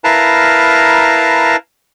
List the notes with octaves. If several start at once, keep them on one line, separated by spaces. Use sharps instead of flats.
E4 A#4 B4 F5 A5 A#5